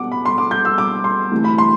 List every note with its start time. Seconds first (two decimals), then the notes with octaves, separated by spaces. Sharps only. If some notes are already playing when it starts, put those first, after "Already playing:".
Already playing: C2 B2 G3 B3 F#5 D6
0.12 B5
0.25 C6
0.38 D6
0.51 G6
0.65 E6
0.78 D6
1.04 C6
1.31 D2 C3 E3 A3
1.44 B5
1.58 C6